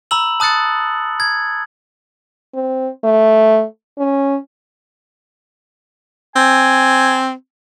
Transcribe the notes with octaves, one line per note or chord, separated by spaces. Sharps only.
A#5 B5 E6 F#7
A5 D#6 F#6 A6 C#7
G#6
C4
A3
C#4
C4 G#5